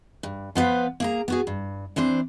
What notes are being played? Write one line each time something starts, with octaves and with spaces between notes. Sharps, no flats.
G2
F3 B3 B4 C5 F5
A#3 G#4 A#5
B3 F#4 G#4
G2
E3 C4 D4 C5